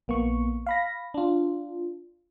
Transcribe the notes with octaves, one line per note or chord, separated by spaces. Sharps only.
A#1 A#3 B3 C#6
F5 B5 A#6
D4 F4